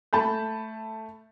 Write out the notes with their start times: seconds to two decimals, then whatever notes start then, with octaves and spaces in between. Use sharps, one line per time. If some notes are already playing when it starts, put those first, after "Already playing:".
0.13 A3 A5 B5 G6